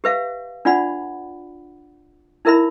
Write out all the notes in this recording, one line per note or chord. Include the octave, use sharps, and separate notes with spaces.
G4 B4 E5 F5
D4 F4 D5 F#5 B5
D#4 E4 A#4 E5 B5